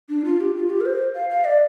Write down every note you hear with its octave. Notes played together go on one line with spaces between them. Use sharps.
D4
F4
G4
F4
G4
A#4
C5
F5
F5
D5